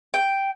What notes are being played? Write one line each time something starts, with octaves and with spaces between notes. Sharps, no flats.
G5